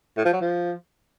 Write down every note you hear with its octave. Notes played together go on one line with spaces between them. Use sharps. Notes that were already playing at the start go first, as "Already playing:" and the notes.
A2
F3
F#3
F3